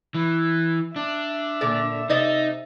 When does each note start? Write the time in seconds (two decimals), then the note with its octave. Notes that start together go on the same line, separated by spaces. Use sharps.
0.14 E3
0.96 D4 E5
1.61 A#2 D3 D5
2.10 C3 D#4 D5 D#5